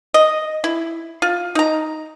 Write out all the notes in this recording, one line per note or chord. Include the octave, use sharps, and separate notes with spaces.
D#5
E4
F4
D#4 A#5